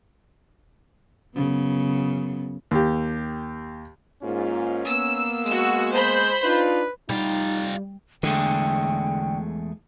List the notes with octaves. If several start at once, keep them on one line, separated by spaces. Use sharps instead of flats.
F#2 C#3 B3
D#2 G4
G#2 A#3 C#4 F4
A#3 B3 E6
G#3 F#4 E6
C5 B5 G6
D4 D#4 F4 B4
G3 D#4 F4 G4
E2 D3 G#3 A3 G5